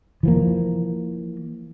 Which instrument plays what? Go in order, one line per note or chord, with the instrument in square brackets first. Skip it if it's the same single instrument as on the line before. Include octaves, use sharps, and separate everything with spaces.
[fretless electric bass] E3 F3 A#3